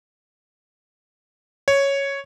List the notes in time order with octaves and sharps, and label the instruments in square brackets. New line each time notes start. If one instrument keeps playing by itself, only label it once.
[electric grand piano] C#5